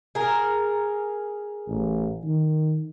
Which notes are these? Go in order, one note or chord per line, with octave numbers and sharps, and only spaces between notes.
G#4 A#4
A1
D#3